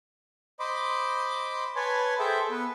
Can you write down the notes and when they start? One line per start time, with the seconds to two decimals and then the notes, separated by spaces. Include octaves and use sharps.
0.60 C5 D#5 B5 C6 D6
1.76 B4 C#5 G#5 A5 B5 C6
2.19 G#4 A4 C5 E5 G5
2.51 B3 B4